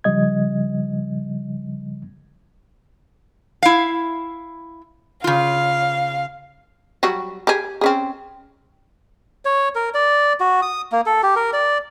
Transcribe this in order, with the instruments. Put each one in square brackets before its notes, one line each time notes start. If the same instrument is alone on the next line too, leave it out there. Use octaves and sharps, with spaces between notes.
[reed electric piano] C#3 F3 G3 D#5 G#6
[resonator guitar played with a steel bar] E4 F5
[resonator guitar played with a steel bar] C#3 F4 [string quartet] F5
[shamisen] F#3 G3 F#4
G4 G#4
C4 C#4 G#4
[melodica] C#5
A#4
D5
F#4
D#6
A#3
A4
G4
A#4
D5